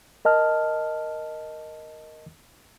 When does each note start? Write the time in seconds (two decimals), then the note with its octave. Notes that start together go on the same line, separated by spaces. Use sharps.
0.25 A#4 D#5 A5 F6